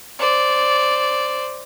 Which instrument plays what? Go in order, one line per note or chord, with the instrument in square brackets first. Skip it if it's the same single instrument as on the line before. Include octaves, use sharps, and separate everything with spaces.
[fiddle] C5 D5